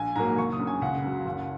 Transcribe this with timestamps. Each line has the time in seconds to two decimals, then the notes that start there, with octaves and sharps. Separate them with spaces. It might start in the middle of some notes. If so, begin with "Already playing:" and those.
Already playing: A#1 G#5
0.16 G#2 F#3 A#3 A#5
0.37 F#1 C#6
0.53 D#6
0.59 F#2 C#3
0.67 G#5
0.82 C#2 F#5
1.04 C#3 F#3
1.26 F#1